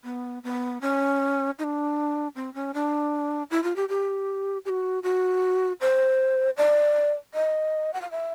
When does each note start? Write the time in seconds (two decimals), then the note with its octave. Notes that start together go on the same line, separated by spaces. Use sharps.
0.04 B3
0.44 B3
0.81 C#4
1.59 D#4
1.64 D4
2.36 C4
2.54 C#4
2.74 D4
3.51 E4
3.64 F4
3.76 G4
3.89 G4
4.65 G4
4.69 F#4
5.03 F#4
5.81 C5
6.57 D5
7.34 D#5
7.93 F#5
8.02 F5
8.11 E5